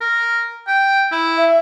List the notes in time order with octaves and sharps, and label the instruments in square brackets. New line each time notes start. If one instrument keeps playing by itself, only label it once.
[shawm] A#4
G5
E4
[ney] E5